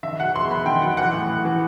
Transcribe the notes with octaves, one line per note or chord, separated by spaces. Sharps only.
D#3 E5
F#3 F#5
E2 C6
E2 B5
D#3 G5
F#3 F#5
E3 F#5
A2
A2
E3